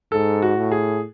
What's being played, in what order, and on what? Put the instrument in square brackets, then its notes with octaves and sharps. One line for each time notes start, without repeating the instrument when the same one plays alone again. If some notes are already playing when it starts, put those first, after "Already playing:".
[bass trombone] G#2 [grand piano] A4
[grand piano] F#4
[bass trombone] A2
[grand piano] G#4